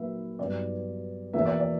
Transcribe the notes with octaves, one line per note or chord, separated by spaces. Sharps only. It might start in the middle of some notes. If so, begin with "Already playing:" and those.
Already playing: A#2 F#3 A#3 A#4 B4 E5
G2 F#3 B3 D5
E2 B2 A#3 E5
D5
D5